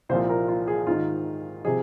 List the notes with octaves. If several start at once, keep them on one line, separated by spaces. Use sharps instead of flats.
C2 A#2 F3 C5
A#4
F4
G#4
G#2 D#3 F4
C3 F3 G#4